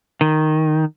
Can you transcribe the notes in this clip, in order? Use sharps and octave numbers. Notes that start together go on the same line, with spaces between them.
D#3